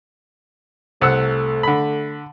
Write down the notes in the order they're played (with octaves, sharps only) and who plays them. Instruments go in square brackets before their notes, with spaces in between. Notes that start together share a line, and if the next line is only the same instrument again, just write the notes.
[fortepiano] C2 F#5 E6 [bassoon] A3
[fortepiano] D3 B5